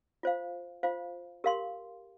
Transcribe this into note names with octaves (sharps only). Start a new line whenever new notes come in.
F4 C5 F5
F4 C5 F5
G4 A#4 F5 C6